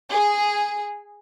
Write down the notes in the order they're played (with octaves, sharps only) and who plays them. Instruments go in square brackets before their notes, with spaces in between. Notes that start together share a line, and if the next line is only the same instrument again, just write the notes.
[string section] G#4